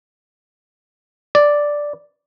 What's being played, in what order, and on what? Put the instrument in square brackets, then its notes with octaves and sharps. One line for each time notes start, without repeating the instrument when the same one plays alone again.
[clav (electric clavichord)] D5